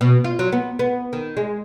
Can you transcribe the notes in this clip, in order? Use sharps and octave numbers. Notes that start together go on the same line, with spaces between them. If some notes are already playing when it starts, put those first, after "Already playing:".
B2
F4
F#3
B3
B3
D#3
G#3